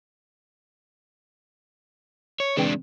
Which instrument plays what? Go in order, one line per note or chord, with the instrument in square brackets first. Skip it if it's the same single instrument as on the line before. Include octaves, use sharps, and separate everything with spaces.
[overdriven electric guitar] C#5
[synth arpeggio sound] C#3 E3 C4 [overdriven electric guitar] G#3 D4